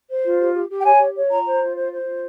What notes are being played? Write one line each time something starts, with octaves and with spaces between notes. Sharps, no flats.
C5
F4
G4
G4
G4
G5
C#5 G#5
G4
C#5
F4 A#5
C5
F4
C5
C5
F4